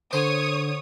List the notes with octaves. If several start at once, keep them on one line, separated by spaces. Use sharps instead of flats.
D3 C5 C#5 C#6 D#6